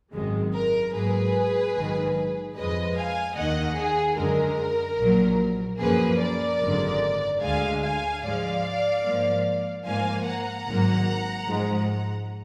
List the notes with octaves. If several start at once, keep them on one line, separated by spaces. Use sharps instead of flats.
G#1 F#2 D#3 G#3
A#4
G#2 F#3 A#3 G#4 B4
A#1 G#2 D#3 F#3
F2 F3 G#3 B4 D#5
F5 G#5
D#2 D#3 A#3 D#5 F#5
G#4
F#2 D3 G#3 A#4
A#1 A#2 F#3
F#2 F3 A#3 G#4 B4
A#4 D5
G#1 F#2 D3 G#3
D2 D3 G#3 F5 G#5
F5 G#5
G#2 F3 G#3 D5 F5
G#2 F3 A#3
G#2 F3 A#3 F5 G#5
F#5 A#5
G#1 G#2 F#3 A#3
G#2 F3 G#3